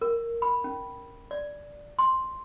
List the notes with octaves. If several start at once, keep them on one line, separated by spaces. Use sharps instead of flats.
A#4
B5
C#4
D5
C6